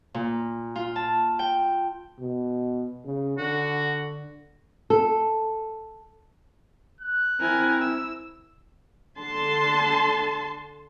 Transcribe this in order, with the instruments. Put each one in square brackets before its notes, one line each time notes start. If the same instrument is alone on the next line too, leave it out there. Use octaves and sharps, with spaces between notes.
[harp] A#2
F4
A5
G5
[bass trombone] B2
C#3
[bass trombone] D3 [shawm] F#4
[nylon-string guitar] A4
[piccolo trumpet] F#6
[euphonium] C4 [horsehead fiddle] E4 [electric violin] A#4 G#5
[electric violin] E6
[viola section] D3 A5 C6